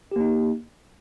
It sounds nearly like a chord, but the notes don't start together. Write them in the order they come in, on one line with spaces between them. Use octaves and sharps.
G4 A#3 D#4